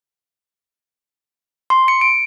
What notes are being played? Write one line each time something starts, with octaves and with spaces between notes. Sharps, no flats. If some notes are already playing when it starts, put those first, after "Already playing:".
C6
C#7
D7